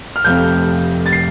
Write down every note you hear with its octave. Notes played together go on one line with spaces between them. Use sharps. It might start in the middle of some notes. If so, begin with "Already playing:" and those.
F6
F1 F2 C3 F3 A3 G6
A6
C7